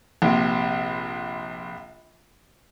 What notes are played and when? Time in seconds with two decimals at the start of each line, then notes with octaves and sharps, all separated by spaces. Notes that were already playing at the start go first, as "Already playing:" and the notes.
0.22 A#1 C3